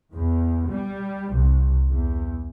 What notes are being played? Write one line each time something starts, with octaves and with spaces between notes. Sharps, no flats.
E2
G3
C2
E2